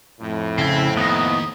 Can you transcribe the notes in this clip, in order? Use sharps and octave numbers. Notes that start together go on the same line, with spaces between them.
F2 A2
C#3 C4 E4
D#2 B3 D#5